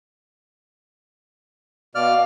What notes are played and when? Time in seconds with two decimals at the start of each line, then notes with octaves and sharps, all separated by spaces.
1.95 B2 D5 F5 F6